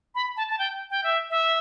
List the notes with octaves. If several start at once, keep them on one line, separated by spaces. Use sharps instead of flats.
B5
A5
A5
G5
G5
E5
E5